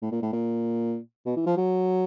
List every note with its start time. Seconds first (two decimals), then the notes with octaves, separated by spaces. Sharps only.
0.02 A2
0.12 A#2
0.22 A2
0.32 A#2
1.26 B2
1.36 E3
1.46 F3
1.57 F#3